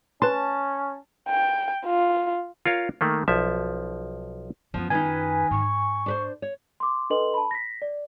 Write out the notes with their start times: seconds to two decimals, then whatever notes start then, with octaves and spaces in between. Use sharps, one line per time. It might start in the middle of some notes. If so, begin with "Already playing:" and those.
0.22 C#4 B4 A5 C6
1.29 G5
1.85 F4
2.66 F4 A#4 C#5 F5
3.01 D#3 A3 A#3
3.28 B1 F3 E5
4.74 F#2 F3 B3 F4
4.90 D#3 D#4 B4 G#5
5.51 G#2 C#6
6.06 D4 B4 C5
6.42 C#5
6.80 C6 D6
7.10 D4 A4 B4 D#5 C6 F#7
7.34 A5 B5
7.51 A#6 B6
7.82 D5